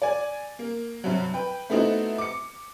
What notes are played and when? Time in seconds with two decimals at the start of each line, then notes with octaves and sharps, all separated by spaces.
0.02 D5 G#5
0.59 A#3
1.04 G2 C3 F#3
1.34 B4 G5
1.70 A3 B3 C4 D#4 E4 F#4
2.18 D6 C#7